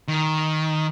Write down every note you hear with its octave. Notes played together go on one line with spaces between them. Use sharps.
D#3